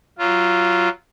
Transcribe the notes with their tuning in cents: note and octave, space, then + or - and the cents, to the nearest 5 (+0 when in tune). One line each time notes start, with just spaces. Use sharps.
F#3 +10 F4 -10